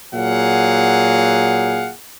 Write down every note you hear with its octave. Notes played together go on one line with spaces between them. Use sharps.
A#2 F#3 G#4 F5 F#5